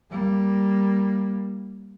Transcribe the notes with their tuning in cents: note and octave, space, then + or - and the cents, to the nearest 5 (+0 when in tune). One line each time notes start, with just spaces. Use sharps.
G3 +0 A#3 +5